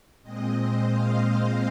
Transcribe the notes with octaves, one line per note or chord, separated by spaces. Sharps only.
A#2 G#3 C4 D#5
C5
F5
F5